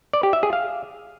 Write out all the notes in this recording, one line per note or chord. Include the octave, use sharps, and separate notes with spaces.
D5
G4
E5
G#4
F5